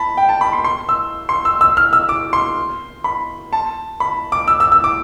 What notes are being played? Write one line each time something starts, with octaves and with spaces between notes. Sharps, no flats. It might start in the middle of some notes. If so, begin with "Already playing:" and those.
Already playing: A5 B5
G5
A5
B5
C6
C6
E6
C6
E6
E6
F6
E6
D6
C6
B5
A5
B5
D6
E6
E6
E6
D6